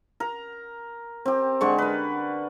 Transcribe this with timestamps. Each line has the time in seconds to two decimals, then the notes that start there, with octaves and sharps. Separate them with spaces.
0.20 A#4 A#5
1.25 C4 G4
1.61 D3 G#3 C#6
1.78 A#4 B4